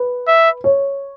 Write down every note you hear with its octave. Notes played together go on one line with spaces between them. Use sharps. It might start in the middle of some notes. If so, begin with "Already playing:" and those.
Already playing: B4
E5
C#5